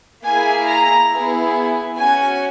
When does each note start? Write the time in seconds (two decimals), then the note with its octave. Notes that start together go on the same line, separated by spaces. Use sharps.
0.23 A#3 E4 G#4 G#5
0.67 A#5
1.11 B3 E4 G#4
1.97 C#4 F#4 G#5